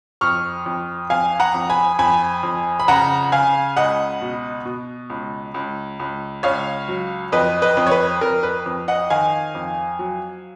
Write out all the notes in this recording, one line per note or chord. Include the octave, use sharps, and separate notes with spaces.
F2 C#6 F6
F2
F2 F5 G#5
F#5 A#5
F2
G#5 B5
F2 G#5 B5
F2
B5
C#3 F#5 A#5
C#3 F5 G#5
C#2 D#5 F#5
B2
B2
C#2
C#2
C#2
C#2 C#5 F5
F#3
F2 B4 D#5
B4 D#5
F2
C#5
B4
F2 A#4
B4
F2
D#5 F#5
D#3 F5 G#5
F2
F#3